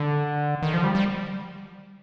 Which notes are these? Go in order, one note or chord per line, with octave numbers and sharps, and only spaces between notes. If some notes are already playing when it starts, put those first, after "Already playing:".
Already playing: D3
D#3
F3
G3
G3